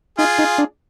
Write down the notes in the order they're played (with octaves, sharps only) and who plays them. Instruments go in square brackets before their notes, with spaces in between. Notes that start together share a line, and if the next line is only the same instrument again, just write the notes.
[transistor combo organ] D#4 [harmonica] F4 G#4
[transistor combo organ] D#4
D4